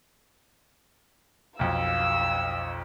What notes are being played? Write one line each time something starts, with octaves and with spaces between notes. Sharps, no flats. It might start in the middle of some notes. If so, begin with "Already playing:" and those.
B1 F2 F5 E6